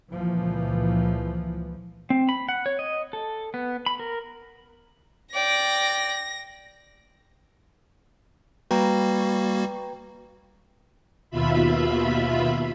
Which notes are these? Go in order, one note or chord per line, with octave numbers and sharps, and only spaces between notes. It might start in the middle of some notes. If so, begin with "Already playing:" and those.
C#2 A#2 E3 F3
C4
B5
F#5
C#5
D#5
A4
B3
B5
A#4
D5 G5 A#6
G3 A#3 F#4 B4 G5 A#5
D#2 B2 F4 E5 B5